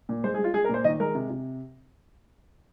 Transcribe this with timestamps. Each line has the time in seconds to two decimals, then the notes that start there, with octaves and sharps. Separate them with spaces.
0.09 A#2
0.24 G#3 C5
0.34 G#4
0.39 G#3
0.44 F4
0.54 G#3 G#4
0.64 A#4
0.69 A#2 C5
0.84 D#3 D#5
1.00 G#3 A#4
1.15 C3
1.30 C3